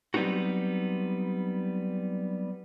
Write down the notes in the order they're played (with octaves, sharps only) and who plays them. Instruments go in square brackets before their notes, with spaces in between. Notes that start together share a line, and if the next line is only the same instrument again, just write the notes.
[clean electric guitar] F#3 G3 B3 C4 D#4 F#4